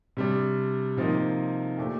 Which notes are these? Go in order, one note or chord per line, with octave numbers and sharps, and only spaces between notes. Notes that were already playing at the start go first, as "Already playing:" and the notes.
C3 G3 D4
C3 F3 A#3 D#4
A#2 A3 D4 G4